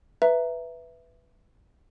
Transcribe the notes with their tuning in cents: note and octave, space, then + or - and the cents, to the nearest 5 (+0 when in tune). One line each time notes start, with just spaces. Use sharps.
B4 +0 E5 +10 A#5 +0